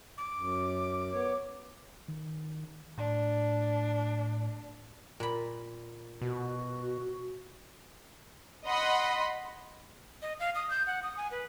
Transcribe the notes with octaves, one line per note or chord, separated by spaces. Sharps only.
D6
F#2
B3 C#5
D#3
A2 D4
A#2 B5
B2 F#4
D#5 F#5 B5 C6
D#5
F5
D#6
G6
F#5
D#6
G#5
B4